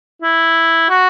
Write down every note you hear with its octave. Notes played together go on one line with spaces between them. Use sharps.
E4
F#4